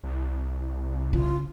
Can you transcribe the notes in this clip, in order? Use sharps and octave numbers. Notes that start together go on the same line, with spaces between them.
C2
C#3 F4